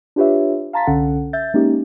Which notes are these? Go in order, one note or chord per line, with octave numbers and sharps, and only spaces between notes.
D4 F4 G4 B4 C#5 E5
F5 A5 A#5 C6 A6 B6
C2 D3 C#4 A4 F#5
E5 G6 A6
G#3 A#3 C#4 D#4 G4